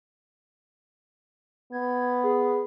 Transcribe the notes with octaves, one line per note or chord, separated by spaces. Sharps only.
B3 G#6
G#4